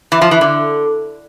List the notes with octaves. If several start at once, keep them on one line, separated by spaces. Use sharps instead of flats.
E3
F3
E3
D3